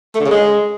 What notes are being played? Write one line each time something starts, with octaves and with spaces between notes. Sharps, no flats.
A3
D3
C#3
G#3